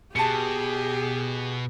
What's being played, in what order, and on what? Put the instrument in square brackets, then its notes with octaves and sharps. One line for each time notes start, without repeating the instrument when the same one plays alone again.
[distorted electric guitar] B2 [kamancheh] G4 G#4 [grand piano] A5 C#7